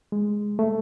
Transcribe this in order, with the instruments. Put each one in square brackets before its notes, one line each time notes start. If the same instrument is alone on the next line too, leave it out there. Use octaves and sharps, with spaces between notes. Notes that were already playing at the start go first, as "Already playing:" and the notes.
[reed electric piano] G#3
A3